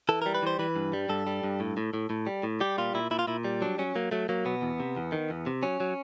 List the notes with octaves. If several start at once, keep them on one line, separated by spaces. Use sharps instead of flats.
E3 A4
G3 A#4
B4
E3 C5
E3 B4
G2
G3
G2 A4
G3
G2
A2
A2
A2
A2
G3
A2
G3 G4
A#2 F4
A#2 E4
A#2 E4
F4
A#2 E4
G3
F#3 D4
F#3 C#4
F#3 A#3
F#3 A3
F#3 A#3
B2 B3
E2
C3
E2
D#3
E2
C3
F#3 C#4
F#3